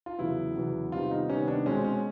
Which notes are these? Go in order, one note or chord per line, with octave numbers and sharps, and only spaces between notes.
F4
E2 C#3 F#3 B3 E4
E2 C#3 F#3 B3
C3 D#3 G3 B3 F4
D#4
C3 D#3 G3 B3 C#4
D4
B2 G#3 C4 C#4
C#4